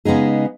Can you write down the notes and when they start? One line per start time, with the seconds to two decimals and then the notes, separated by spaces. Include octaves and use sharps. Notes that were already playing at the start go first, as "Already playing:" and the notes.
0.05 C#3 G#3 B3 D#4 G#4